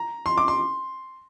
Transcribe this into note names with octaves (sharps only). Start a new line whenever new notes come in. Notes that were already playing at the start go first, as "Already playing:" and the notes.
Already playing: A#5
C6
D6
C6